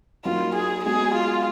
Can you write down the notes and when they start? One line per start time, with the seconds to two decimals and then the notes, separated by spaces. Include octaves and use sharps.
0.24 F#3 A#3 D#4 F4 A#4
0.55 G#4
0.85 G#3 B3 F#4 G#4
1.14 F4